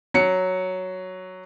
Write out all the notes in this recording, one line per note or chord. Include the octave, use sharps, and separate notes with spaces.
F#3 C#7